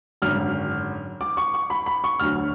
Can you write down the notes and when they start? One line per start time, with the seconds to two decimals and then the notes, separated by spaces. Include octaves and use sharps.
0.22 G#1 F#2 D3 F#3 F6
1.21 D6
1.37 C#6
1.54 C#6
1.70 B5
1.86 B5
2.04 C#6
2.19 D2 D3 F#3 F6